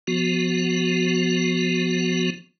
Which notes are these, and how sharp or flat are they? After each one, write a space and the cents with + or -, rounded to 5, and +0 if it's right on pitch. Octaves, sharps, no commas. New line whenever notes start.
F3 +0 B3 +0 F#4 +0